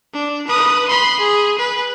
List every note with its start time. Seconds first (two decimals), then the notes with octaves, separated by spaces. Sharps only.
0.13 D4
0.47 B4 D#6
0.88 B5 C6
1.20 G#4
1.58 B4